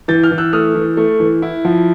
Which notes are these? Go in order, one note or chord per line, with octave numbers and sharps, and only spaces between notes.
E3 G6 A6
F6 G6
E3
E6 F#6
A3 D#6 F6
E3
A3
E3
E4
F3